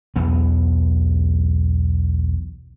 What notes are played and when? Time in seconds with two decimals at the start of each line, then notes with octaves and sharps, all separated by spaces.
0.16 B1 E2 E3 B3